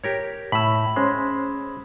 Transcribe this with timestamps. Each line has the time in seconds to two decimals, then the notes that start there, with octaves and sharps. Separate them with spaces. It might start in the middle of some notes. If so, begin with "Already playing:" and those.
0.04 G4 A#4 C#5
0.52 A2 B5 E6
0.96 G#3 C#4 C5 C6